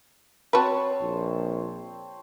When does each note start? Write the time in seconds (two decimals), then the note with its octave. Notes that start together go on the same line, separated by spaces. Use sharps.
0.53 C4 F#4 B4 C#5 A5
1.02 A#1